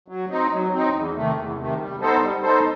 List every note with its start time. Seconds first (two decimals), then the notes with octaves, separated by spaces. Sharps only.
0.08 F#3
0.30 C4 D#4
0.51 F#3
0.72 C4 D#4
0.94 E2
1.15 C3 D#3 A3
1.36 E2
1.57 C3 D#3 A3
1.79 G3
2.00 B3 D#4 A4 C5
2.21 G3
2.42 B3 D#4 A4 C5